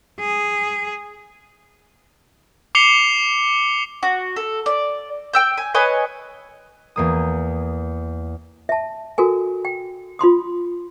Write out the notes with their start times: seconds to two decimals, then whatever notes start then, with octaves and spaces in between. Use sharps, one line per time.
0.19 G#4
2.75 D6 C7 C#7 F7 G7
4.03 F#4
4.36 A4
4.66 D5
5.33 G5 E6 G6
5.58 G#5
5.75 B4 C#5 D#5 G#5
6.96 E2 A#3 D#6
8.69 E5 A5
9.18 F#4 A4 A#4 G#5
9.65 G5
10.19 F4 B5 C6 D#6